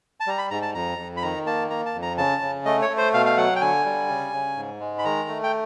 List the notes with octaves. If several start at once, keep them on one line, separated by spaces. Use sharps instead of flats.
A5
G3 A#5
B5
G#2 A#5
A5
F2 A#5
F2
B5
D#3 A#5
A#3 A5
A#3 A#5
A5
F2
A#5
C#3 A5
C#3
A3 D#5
C#5
A3
C5
B2 F5
F5
F#3 F#5
G5
D3 G#5
G3
C#3
C#3
G#2
G#3
B5
D#3 A#5
A3
G5